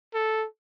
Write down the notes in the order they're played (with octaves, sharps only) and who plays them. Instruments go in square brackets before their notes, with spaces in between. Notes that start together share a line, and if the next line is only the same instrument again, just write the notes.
[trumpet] A4